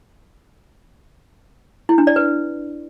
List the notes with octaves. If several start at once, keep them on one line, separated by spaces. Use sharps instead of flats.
E4
D4
D5
B4